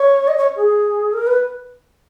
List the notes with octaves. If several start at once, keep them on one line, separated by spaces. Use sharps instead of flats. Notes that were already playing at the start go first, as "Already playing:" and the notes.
Already playing: C#5
D#5
C#5
G#4
A#4
B4